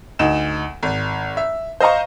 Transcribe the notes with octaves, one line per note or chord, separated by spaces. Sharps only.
D2 D#4 E7
G#1
E5
C5 D#5 F5 A#5 C#6